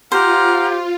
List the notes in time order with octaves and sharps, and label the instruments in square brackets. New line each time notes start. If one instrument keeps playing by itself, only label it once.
[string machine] F4 [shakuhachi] G4 [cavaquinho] C5 [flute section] F#5 A#5 F6